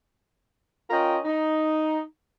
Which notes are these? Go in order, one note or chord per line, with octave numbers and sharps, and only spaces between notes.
C#4 F4 A#4 D#5 G5
D#4